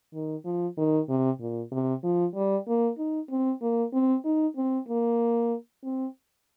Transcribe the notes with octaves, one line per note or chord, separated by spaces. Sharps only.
D#3
F3
D#3
C3
A#2
C3
F3
G3
A#3
D#4
C4
A#3
C4
D#4
C4
A#3
C4